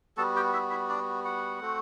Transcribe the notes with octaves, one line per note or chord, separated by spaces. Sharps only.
G3 B3 F#4 A4 A5
G4 G5
E4 E5
E4 E5
D4 D5
F#4 F#5
A3 C4 F#4